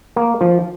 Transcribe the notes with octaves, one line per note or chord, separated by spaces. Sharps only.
A#3
F3